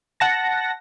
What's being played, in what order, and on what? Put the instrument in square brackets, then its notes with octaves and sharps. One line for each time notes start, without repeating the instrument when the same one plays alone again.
[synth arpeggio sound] F#5 A5 A#6